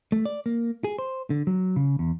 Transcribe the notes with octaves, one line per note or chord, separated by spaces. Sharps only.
A3
D5
A#3
G#4
C5
D3
F#3
C#3
E2